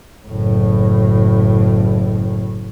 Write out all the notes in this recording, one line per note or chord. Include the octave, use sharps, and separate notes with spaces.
F#1 A2